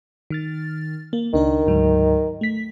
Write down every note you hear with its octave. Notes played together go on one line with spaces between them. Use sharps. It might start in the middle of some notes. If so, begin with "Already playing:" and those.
D#3 F6 A6
A#3
C#2 D#3 D4 A#4
D2 G#2 F#3
A3 B6